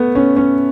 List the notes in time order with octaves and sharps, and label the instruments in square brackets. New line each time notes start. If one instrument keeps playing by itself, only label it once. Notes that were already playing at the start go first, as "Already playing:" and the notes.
Already playing: [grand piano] A3 B3
C#4
C#4